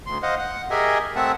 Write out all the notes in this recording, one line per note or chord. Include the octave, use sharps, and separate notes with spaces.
D2 C6
C5 D#5 F5 F#5
F#5
G4 G#4 A#4 D#5 E5 G#5
A3 C4 E5 F#5 A5